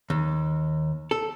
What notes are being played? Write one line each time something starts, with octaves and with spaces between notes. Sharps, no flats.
D#2
A4